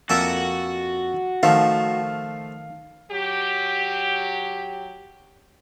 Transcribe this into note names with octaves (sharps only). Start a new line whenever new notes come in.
F2 A#3 F#4 A4 D5 E5 F5
D#3 F3 A3 F4 F5
F#3 G4